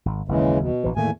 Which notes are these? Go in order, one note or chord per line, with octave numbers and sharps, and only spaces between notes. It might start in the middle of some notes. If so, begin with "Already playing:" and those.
G#1
F#1 D#2 C#3 E3 G#3
B2
A#1 E3
E2 A2 D#3 A3 A#3 G#5